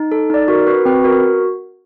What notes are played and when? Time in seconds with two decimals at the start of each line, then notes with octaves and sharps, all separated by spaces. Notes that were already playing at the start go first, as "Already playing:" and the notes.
Already playing: D#4
0.12 A4
0.30 D#4 D5
0.48 F#4 A#4
0.67 F#4 B4
0.85 C4 B4
1.04 F#4 A#4